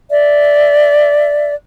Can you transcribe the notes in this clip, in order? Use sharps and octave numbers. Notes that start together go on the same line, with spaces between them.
D5 E5